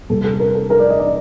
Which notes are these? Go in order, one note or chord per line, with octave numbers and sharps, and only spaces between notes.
C3 G3 A4
A4
A#4
A4
A#4
D5
D#5
D5